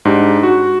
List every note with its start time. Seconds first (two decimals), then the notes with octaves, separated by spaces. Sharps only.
0.05 G#2 D4 G4
0.43 F#4